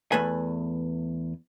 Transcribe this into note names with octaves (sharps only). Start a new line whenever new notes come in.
E2 A3 B4 G#5